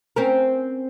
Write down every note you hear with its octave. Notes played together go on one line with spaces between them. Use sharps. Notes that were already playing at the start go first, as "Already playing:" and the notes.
C4 C#4 A#4